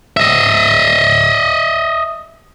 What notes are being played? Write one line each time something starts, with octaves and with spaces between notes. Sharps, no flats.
D#5 E5